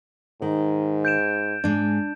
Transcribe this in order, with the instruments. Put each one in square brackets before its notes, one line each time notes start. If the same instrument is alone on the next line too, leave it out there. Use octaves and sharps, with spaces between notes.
[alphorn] G#2 [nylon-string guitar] D#3
[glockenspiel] G6 D7 E7
[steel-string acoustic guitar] G#2 G#3 [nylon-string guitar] D4